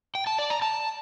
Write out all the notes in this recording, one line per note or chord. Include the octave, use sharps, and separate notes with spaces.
G5
A5
D5
A#5
A5